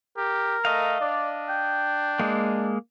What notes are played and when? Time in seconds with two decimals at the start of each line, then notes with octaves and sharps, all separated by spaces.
0.17 G4 A#4
0.65 A3 D#5 F5
1.01 D4 D5
1.49 G5
2.19 G#3 A#3